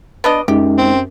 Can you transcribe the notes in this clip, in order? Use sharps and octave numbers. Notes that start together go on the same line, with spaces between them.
B3 D4 D#5
F#2 G#3 D#4 G4
C4